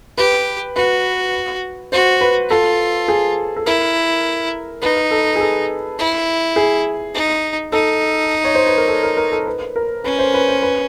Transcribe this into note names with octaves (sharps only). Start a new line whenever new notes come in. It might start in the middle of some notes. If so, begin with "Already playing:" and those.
G4 B4
F#4 B4
F#4 C5
B4
F4 A4
G#4
A4
E4 A#4
D#4 B4
A4
G#4
A4
E4
G#4
D#4
D#4 A4
C#5
C5
B4
A#4
A4
A#4
A#4
A4
B4
A#4
C#4 B4
C5
B4
C5
B4